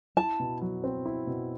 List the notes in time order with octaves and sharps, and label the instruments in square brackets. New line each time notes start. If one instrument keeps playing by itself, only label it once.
[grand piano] E4 [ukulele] A5
[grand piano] B2
F#3
C4
E4
B2